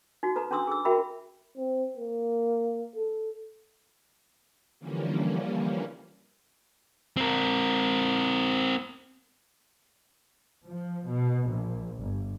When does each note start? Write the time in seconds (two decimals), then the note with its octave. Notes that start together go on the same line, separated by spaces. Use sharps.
0.23 D#4 F#4
0.36 A4 B4 A#5
0.51 C#4 D4 A4 C6 D#6 E6
0.67 G#4 E6
0.85 F#4 A#4 E5 G5 B5
1.57 C4
1.98 A#3
2.96 A4
4.80 D3 E3 F3 G3 A#3 C#4
7.17 C4 A#4
10.68 F3
11.07 B2
11.48 A#1
12.01 G1